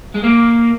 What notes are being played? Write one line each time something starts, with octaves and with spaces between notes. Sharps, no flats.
G#3
A#3